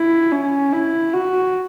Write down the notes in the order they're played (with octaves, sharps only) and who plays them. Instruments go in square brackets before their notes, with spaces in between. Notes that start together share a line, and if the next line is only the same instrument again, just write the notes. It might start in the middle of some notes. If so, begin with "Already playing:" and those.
Already playing: [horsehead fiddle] E4
C#4
E4
F#4